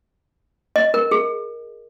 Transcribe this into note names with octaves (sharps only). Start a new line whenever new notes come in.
D#5
A#4
G#4